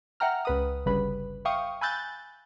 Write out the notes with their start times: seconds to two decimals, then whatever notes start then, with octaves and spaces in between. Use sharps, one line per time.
0.20 E5 F#5 G5 A#5 F6
0.45 C#2 B4 D#6
0.86 G1 C#3 G3 B4 B5
1.45 E5 F5 G5 C#6 D#6
1.81 G#5 B5 E6 F#6 G6 A6